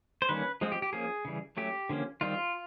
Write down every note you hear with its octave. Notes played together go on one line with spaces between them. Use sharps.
C5
D#3 G3 A#3 C#4 B4
F3 G#3 C4
G4
G4
F3 A#3 C#4 G#4
C#3 E3 G3
F#3 A3 C#4 G4
D3 F3 A#3 C#4
D#3 G3 C4 F4